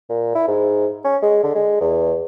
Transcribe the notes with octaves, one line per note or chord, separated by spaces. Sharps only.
A#2
E4
G#2
C#4
G#3
D3
G#3
E2